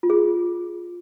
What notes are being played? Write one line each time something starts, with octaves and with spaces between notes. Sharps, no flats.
F4
G#4